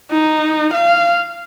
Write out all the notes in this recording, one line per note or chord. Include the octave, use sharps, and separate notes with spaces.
D#4
F5